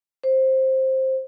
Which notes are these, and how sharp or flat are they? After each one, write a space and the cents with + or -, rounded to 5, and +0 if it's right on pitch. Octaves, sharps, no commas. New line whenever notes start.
C5 +10